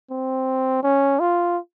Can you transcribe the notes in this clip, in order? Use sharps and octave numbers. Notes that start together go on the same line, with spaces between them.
C4
C#4
F4